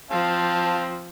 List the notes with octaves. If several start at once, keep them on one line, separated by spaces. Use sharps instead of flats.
F3 C4 F5 A5